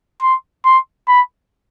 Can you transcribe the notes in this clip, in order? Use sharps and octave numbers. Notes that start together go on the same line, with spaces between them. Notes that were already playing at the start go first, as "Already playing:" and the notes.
C6
C6
B5